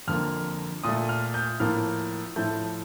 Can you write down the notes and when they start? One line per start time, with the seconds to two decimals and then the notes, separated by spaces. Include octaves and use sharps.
0.07 F2 D3 F3 A#3 F6
0.84 A#2 A3 D#6
1.09 F6
1.34 G6
1.60 A2 F3 A#3 F6
2.36 A2 F3 A3 G6